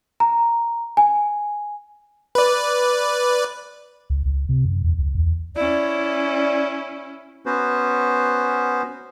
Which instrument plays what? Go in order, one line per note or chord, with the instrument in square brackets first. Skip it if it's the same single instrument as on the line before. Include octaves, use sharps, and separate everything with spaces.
[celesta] A#5
G#5
[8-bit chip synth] B4 D5
[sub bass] C#2
C#2
C3
F#2
E2
C#2
E2
[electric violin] C#4 E4 [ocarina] D5
[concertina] B3 C#4 F#4 B4 C5